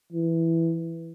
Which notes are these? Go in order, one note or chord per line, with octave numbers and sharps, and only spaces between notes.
E3